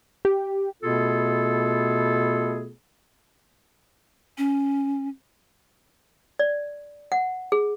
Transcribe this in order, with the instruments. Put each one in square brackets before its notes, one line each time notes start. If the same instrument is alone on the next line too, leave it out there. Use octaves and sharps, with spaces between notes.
[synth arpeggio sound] G4
[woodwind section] B2 A3 B3 F4 G#4 A4
[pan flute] C#4
[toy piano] D5
F#5
G#4